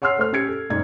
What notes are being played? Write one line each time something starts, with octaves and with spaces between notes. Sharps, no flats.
C#5 F#5 C6 E6 F6 C7
A3 C5 F6
C#4 G4 G#6 C#7
A4
F#1 G#2 D5 G#6